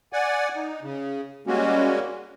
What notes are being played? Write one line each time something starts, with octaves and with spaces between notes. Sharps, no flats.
D5 F#5 G#5
D#4
C#3
G3 G#3 A#3 C#4 F#4